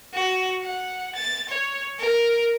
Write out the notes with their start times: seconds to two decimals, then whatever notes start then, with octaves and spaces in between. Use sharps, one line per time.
0.14 F#4
0.62 F#5
1.15 A6
1.49 C#5
1.99 A#4